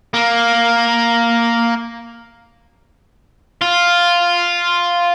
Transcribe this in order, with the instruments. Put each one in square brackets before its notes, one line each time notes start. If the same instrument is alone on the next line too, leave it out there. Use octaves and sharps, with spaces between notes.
[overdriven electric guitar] A#3
F4